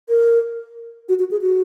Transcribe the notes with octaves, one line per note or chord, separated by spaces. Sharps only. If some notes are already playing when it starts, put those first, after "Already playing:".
A#4
F#4
F#4
G#4
F#4